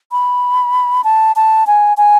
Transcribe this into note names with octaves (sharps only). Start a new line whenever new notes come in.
B5
A5
A5
G#5
G#5